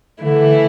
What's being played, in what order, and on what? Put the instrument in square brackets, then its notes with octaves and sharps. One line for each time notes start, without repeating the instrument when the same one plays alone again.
[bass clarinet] D3 [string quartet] E3 A3 E4